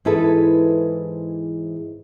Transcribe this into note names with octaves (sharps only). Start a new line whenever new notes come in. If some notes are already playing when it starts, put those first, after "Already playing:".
G#2 E3 E4 G#4 A4 B4